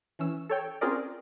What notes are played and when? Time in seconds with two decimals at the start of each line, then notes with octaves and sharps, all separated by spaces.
0.19 E3 C#4 E6
0.50 A4 C#5 G5
0.81 C4 C#4 F4 G#4 A#4 D5